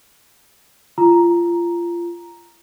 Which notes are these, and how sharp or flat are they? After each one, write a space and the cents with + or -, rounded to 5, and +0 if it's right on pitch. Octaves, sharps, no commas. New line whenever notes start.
F4 -25 A#5 +5